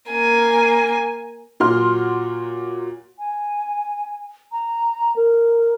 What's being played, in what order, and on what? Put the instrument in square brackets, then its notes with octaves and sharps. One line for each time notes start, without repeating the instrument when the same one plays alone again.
[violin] A#3 G#5
[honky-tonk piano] A#2 F#3 F#4 C6 F6
[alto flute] G#5
A#5
A#4